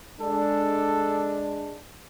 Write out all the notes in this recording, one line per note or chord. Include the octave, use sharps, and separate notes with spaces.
G#3 D4 A4